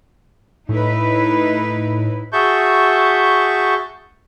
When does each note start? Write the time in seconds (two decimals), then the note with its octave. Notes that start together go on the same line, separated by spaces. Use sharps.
0.69 A2 D#4 E4 B4
2.32 F#4 G#4 E5 A5 C#6 G6